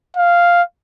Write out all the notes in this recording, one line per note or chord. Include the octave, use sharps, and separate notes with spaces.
F5